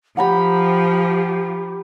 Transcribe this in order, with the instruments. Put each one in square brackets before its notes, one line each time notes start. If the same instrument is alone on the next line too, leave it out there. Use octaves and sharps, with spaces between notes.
[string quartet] F3 [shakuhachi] G4 [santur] F#5 A#5 B5